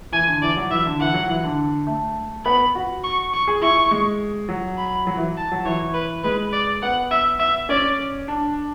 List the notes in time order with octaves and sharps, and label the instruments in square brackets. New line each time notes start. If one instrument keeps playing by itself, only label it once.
[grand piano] E3 [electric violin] G#5
[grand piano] D3
[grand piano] E3 [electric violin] D5
[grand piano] F#3
[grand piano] E3 [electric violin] E5
[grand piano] D3
[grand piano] E3 [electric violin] F#5
[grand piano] F#3
E3
D3
A3
[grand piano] B3 [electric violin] B5
[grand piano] F#4
[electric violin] C#6
C#6
[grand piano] G#4
[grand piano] E4 [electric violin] C#6
[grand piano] G#3
F#3
[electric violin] B5
[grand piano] F#3
E3
[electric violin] A5
[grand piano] F#3
[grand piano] E3 [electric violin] C#5
[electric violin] B4
[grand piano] G#3 [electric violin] B4
[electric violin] D5
[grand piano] B3 [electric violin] F#5
[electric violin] E5
E5
[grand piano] C#4 [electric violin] D5
[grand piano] D4